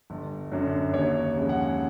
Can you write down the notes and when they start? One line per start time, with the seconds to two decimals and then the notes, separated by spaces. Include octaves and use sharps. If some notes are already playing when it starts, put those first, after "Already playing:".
0.10 G1
0.52 F#2 D3 F#3
0.93 D#2 C#5
1.35 C#3 F3 G#3
1.49 F#5